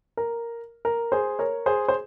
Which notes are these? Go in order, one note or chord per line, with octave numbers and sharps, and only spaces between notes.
A#4
A#4
G#4 C5
A#4 C#5
G#4 C5
C5